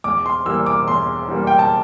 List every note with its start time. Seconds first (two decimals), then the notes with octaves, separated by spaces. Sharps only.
0.04 E2 D6
0.26 C6
0.46 E3 G3 A#3 E6
0.66 D6
0.87 E2 C6
1.28 E3 G3 A#3
1.47 G5
1.59 A5